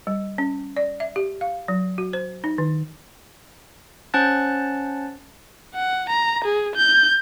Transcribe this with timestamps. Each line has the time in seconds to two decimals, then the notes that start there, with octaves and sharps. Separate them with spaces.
0.07 G3
0.38 C#4
0.76 D5
1.00 E5
1.16 G4
1.41 F5
1.68 F#3
1.98 F#4
2.13 C5
2.44 D#4
2.58 D#3
4.14 C#4 C5 F#5 A5 F#6 A6
5.75 F#5
6.10 A#5
6.45 G#4
6.76 G6